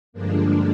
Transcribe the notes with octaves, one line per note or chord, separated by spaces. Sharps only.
G2 D3 F3 G#3 A#3 D4